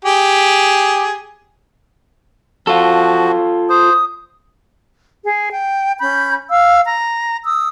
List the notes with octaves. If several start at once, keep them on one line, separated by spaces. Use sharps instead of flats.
G4 G#4
F3 F4 F#4 A4
C5 D#6
G#4
G5
C#4 B5 G6
F5 E6
A#5
D#6 E6